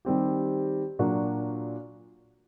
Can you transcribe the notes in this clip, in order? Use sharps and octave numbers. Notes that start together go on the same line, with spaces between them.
D#3 G3 C4 G4
A#2 F#3 A#3 D4 F#4